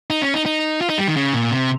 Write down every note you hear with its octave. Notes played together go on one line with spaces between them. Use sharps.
D#4
C#4
D#4
D#4
F4
D#4
G3
D#3
C#3
A#2
C3